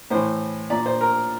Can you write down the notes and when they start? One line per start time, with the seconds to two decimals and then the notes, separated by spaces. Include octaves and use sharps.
0.10 A2 E3 C5
0.70 A#2 D5
0.86 C5
1.01 A#4